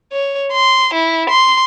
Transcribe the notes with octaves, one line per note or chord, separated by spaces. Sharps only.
C#5
C6
E4
C6